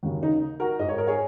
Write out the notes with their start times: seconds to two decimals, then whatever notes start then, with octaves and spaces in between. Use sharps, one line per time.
0.03 D#2 C#3 F#3
0.23 D#4
0.60 F#4 A#4
0.79 G#2 G#3 D#5
0.89 C#5
0.98 A#4
1.07 G#4 C#5